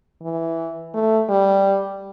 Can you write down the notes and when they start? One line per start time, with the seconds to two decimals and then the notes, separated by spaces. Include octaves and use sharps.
0.22 E3
0.94 A3
1.29 G3